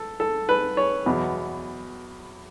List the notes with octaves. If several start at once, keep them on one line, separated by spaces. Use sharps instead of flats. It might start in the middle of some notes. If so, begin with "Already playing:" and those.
Already playing: A4
A4
B4
C#5
E2 B2 F#3